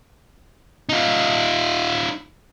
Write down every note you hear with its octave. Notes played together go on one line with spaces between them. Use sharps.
D#4 F4